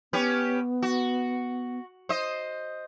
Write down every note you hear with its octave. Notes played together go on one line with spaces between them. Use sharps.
B3 C#4 G4 B4
F#4
C5 D#5